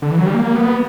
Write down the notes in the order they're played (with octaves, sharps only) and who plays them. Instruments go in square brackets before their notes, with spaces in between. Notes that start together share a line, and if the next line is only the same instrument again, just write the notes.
[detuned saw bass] D3
E3
F#3
G3
A#3
B3